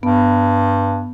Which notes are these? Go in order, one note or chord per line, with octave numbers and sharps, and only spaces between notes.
G2 B3